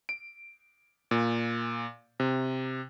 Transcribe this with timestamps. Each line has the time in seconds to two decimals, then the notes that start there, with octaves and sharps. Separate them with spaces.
0.09 D7
1.11 A#2
2.20 C3